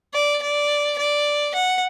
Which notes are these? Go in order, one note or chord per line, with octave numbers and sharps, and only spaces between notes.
D5
D5
D5
F#5